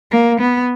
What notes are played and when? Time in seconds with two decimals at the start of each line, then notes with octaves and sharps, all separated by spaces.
0.12 A#3
0.40 B3